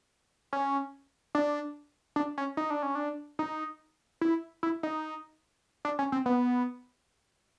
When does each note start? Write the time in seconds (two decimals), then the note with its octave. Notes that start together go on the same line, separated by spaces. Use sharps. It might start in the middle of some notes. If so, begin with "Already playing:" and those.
0.53 C#4
1.35 D4
2.16 D4
2.38 C#4
2.57 D#4
2.70 D4
2.83 C#4
2.95 D4
3.39 D#4
4.21 E4
4.63 E4
4.83 D#4
5.85 D4
5.99 C#4
6.12 C4
6.26 B3